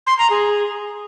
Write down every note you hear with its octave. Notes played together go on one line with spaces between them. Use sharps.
C6
A#5
G#4